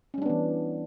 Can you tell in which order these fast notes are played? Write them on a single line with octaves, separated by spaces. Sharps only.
C#4 G3 D4 B3 E3